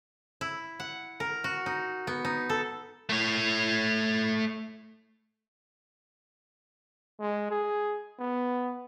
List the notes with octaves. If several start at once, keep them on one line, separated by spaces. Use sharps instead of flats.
E4
F#5
A#4
F#4
D#4
B3
D#4
A4
A3 C#5
G#3
G#4
B3